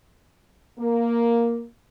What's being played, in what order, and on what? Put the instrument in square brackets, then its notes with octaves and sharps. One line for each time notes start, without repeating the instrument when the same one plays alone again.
[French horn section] A#3